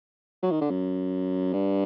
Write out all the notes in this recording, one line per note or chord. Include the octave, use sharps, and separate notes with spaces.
F#3
D#3
D3
F#2
G2